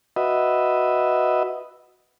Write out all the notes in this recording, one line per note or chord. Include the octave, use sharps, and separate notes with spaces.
F#4 B4 D#5 E5